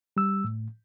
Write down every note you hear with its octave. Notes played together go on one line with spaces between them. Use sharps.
G3 E6
A2